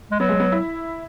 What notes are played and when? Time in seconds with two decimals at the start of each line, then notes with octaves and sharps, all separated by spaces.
0.11 G#3
0.19 F#3 B3
0.29 G#3
0.40 B3
0.52 E4